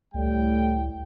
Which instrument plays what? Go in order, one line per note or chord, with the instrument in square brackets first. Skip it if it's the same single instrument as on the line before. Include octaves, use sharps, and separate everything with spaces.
[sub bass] C#2 [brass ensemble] A2 G3 G5